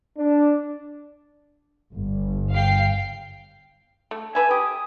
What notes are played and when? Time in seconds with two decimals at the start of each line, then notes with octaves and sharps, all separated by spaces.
0.18 D4
1.94 G1
2.52 F5 G5 C7
4.11 A3
4.35 A3 B4 E5 G#5
4.51 G4 D#6